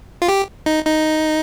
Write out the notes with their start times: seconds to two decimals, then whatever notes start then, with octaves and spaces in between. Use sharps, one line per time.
0.22 F4
0.28 G4
0.66 D#4
0.86 D#4